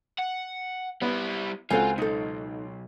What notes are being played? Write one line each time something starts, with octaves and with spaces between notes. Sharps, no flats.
F#5
G3 B3 E4
C#2 C4 F4 F#4 A4 F5 G#5
B1 D#4 A4